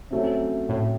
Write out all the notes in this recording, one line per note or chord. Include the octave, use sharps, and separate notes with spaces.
C3 F#3 A3 C#4
A2